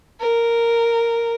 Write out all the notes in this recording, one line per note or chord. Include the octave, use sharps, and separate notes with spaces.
A#4